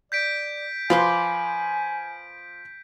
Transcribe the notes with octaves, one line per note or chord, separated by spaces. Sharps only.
D5 G6 B6 D7
F3 F4 B4 G#5 C6 D6